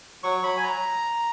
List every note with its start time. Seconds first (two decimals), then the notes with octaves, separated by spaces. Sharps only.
0.23 F#3 C#6
0.43 F#3 B5
0.57 G#5
0.63 A#5